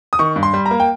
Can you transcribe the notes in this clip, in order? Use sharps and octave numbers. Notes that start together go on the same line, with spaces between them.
D#6
D#3 C#6
G2
C6
G3
A#5
A#3
G5